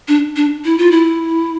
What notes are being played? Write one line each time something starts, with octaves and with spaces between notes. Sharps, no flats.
D4
D4
E4
F4
E4